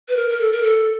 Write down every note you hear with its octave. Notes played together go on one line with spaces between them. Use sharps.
B4
A#4
A#4
A4
A#4
A4